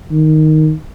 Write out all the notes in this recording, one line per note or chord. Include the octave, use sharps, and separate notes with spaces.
D#3